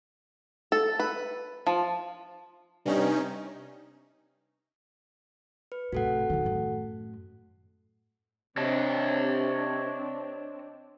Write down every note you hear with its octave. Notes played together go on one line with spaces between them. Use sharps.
A4
B4
F3
G2 C3 C#4 D#4
B4
A2 C3 F#4 A4 F#5
C3 D#3
F#2 A2
C3 C4 D4 C#5 D#5 A5